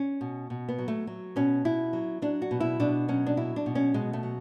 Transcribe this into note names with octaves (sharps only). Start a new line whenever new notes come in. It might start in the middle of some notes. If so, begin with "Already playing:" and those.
Already playing: C#4
B2
B2
B3
F#3
A3
F#3
B2 C#4
B2 E4
F#3
F#3 D4
F#4
B2
E4
B2 D4
F#3 C#4
D4
F#3 E4
D4
B2
C#4
B2 G#3
A3
F#3